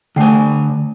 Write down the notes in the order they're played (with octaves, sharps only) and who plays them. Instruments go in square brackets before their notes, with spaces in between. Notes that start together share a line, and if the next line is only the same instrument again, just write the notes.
[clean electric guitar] D3 G#5 [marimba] A3 G5